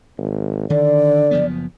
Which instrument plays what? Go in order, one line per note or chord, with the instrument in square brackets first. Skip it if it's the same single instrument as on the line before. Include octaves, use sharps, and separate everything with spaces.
[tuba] G#1
[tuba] D3 [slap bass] D#3 D4 [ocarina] D5
[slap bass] F#1 F3 B3